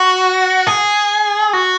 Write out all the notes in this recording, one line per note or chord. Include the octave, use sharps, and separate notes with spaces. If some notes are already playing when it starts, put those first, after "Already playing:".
Already playing: F#4
G#4
F#4